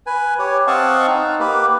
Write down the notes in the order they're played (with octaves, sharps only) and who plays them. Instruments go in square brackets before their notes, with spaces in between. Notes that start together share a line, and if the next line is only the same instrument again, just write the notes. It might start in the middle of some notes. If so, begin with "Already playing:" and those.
[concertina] B4 G#5
G4 C#5
C4 D#5 F5 F#5 A5 C#6
D#4
A#3 G4 B4